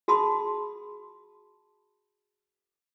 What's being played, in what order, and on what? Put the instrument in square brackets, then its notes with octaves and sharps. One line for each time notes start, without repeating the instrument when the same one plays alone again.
[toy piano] F#4 G#4 A5 B5 C6 D#6